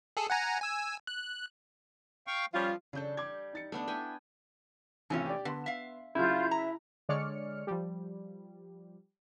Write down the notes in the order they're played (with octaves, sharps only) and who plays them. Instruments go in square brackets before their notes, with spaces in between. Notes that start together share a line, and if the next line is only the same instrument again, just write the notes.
[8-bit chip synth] G#4 A4
F#5 G#5 A#5
G#5 E6
F#6
[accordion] F5 G5 C#6
[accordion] F3 [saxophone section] G3 C#4 F4
[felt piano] C#3 G6 [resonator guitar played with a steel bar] F#3 D4 A4
[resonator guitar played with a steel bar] G3 [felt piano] D6 G#6
[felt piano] D#4 A6 C#7
[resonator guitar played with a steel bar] D3 [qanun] A3 B3 D4
[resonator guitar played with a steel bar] E4 [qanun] G5 G#5
[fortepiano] G#1 C3 F4 [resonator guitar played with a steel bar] E3 A3 C#4
[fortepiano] G4 D5
[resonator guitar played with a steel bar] D3 [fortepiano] B3 C6
[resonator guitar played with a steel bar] E5 F5
[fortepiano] C#3 F#3 [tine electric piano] E4 [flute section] F4 G6
[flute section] E5 [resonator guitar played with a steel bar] A#5
[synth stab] D3 G#3 C#5 D5 F6 C#7
F3 G3